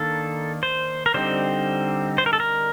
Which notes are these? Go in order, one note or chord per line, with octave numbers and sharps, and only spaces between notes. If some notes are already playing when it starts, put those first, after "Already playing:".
Already playing: D#3 A#3 D4 A4
C5
A#4
D3 G3 C4 D#4 C5
C5
A#4
A4
A#4